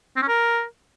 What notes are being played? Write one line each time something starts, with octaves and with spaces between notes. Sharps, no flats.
C4
C#4
A#4